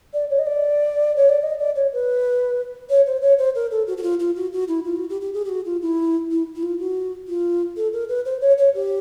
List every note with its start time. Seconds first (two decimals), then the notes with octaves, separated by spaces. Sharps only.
0.13 D5
0.30 C#5
0.39 D#5
0.46 D5
1.16 C#5
1.29 D5
1.43 D#5
1.59 D5
1.75 C#5
1.93 B4
2.90 C#5
3.06 C5
3.22 C#5
3.38 C5
3.55 A#4
3.71 A4
3.87 F#4
3.97 F#4
4.03 F4
4.19 F4
4.36 F#4
4.52 F#4
4.68 E4
4.84 F4
4.96 F#4
5.09 G4
5.21 G4
5.34 G#4
5.44 G4
5.49 F#4
5.65 F4
5.82 E4
6.31 E4
6.55 E4
6.63 F4
6.79 F#4
7.28 F4
7.76 A4
7.93 A#4
8.09 B4
8.25 C5
8.41 C#5
8.58 C#5
8.74 G4